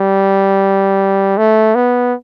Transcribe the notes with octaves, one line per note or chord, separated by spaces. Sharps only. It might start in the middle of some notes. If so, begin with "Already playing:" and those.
Already playing: G3
A3
B3